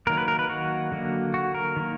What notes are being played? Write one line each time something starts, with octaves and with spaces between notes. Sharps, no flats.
D#3 F#3 A#3 A#4
B4
A#4
B4
F#4
D3 F#3 A#3
F#4
A#4
D#3 A#3